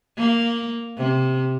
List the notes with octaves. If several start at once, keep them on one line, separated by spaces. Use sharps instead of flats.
A#3
C3